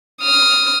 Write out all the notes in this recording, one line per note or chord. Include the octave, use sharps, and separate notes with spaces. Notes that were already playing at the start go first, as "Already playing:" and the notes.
D#6 F6